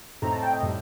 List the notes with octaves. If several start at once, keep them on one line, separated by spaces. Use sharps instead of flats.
A2 A3 C4 D#4 A#5
A5
G5
D#5
A2 G3